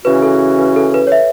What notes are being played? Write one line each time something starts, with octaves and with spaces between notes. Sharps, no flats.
C#3 E3 C#4 F#4 B4
A4
B4
A4
B4
C#5
E5